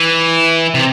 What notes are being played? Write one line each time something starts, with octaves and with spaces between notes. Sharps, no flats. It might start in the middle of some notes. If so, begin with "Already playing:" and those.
Already playing: E3
C3